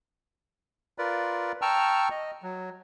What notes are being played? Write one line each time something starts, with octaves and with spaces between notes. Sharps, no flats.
F4 A#4 B4 D5
G5 A5 A#5 C#6 E6 F6
D#5
F#3